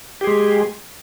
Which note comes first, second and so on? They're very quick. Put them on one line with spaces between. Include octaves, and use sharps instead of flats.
G4 G#4 G#3